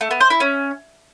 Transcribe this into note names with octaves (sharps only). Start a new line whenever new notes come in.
A3
B3
C5
E4
C#4